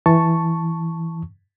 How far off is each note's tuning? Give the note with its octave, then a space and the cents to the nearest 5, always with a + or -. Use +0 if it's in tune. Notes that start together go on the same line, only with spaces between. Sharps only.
E3 +0 A5 +0 C#6 +0